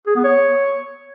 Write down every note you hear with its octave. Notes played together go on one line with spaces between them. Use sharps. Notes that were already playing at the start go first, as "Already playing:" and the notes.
G#4
B3
C#5